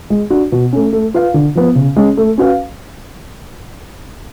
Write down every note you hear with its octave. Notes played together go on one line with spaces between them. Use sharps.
G#3
D4 F#4
B2
A3 C#4
A3
F4 B4 F5
D3
F3 B3
C#3
G#3 C#4
A3
C#4 F#4 B4 F5